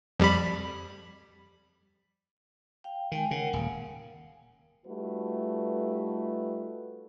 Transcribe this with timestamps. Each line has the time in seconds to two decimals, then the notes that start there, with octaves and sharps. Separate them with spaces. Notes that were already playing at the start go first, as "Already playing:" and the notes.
0.20 F2 G3 B5
2.84 F5 G5
3.12 D#3 G#3 G5 G#5
3.31 C#3 A#4 F#5
3.53 D#1 F5 G#5
4.86 G3 A3 D#4 F4 F#4 B4